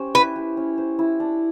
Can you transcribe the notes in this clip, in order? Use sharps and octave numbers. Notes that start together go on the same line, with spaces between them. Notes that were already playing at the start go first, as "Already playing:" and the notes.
Already playing: C#4 G4 C5
E4 B4
G4
C#4
C5
E4
D4